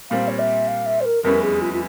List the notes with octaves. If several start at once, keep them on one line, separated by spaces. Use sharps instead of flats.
A#2 G3 C4 F5
C#5
E5
F5
E5
C5
A#4
F1 E2 E3 G3 C#4 A#4
G#4
F4
F4